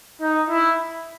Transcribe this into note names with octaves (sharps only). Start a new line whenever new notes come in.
D#4
E4